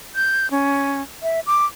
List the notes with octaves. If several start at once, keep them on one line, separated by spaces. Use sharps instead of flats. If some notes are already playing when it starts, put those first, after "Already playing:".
G6
C#4
E5
D6